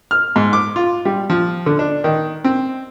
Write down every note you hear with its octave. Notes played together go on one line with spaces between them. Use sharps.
F6
G#2
D6
F4
G3
F3
D3
D4
D#3
C4